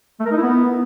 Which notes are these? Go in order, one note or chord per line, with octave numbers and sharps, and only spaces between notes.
A3
A#4
D#4
E4
B3